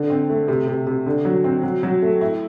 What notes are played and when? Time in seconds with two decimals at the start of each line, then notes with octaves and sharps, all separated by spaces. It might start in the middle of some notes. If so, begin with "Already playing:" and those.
Already playing: D3
0.10 C4
0.30 A3
0.48 C3
0.67 C3
0.87 C3
1.06 D3
1.25 F#3
1.44 C4
1.63 F#3
1.83 F#3
2.02 A3
2.21 E4